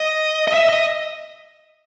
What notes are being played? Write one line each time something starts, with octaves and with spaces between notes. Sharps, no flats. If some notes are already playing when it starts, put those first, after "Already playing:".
Already playing: D#5
D#5
E5
D#5